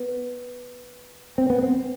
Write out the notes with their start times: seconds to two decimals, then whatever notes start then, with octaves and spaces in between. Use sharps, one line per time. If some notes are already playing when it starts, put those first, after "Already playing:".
Already playing: B3
1.38 C4
1.50 B3
1.62 C4